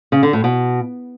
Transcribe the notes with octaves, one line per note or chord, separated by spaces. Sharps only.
C#3
D3
A2
B2